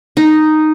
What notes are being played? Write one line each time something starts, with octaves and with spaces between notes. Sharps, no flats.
D#4